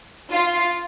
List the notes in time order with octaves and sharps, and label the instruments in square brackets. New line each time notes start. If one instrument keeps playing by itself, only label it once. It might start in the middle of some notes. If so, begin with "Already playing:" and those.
[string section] F4